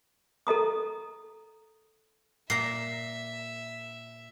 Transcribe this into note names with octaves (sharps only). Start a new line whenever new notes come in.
A4 D#5 A#5 D#6
A#2 E5 A#5 C7